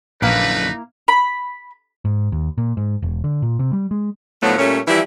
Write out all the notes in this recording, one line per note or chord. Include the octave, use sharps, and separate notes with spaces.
A#1 F#2 D3 A#3 D#4 E4 B4 F5
B5
G#2
D#2
A#2
G#2
E1
D3
A#2
C3
G3
G#3
A2 D3 F3 F#3 A3 B3
A#2 G3 A3 C#4
E3 F3 G3 E4